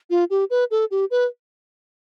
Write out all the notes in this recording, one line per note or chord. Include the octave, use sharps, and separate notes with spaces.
F4
G4
B4
A4
G4
B4